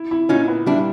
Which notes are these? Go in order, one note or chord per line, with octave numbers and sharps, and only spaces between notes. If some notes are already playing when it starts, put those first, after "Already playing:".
Already playing: E4
E4
A#2 C#4 D#4
B3
G3 D4 E4